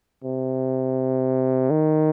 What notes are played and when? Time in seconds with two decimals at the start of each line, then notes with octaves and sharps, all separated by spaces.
0.24 C3
1.70 D#3